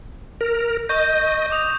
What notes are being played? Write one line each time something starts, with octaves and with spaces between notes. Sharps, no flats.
A#4
D#5 C#6 G6
D6 D#6 F7